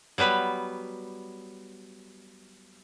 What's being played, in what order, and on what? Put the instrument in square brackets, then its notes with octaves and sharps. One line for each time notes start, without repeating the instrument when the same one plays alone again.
[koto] F#3 G3 B3 B4